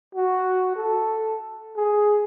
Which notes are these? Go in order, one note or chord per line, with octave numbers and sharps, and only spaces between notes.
F#4
A4
G#4